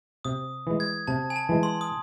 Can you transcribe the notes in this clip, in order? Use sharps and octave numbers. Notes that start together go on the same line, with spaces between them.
C3 D#6
E3 G#3
G#6
C3 A5
G#5
A5
E3 G#3
C6
D#6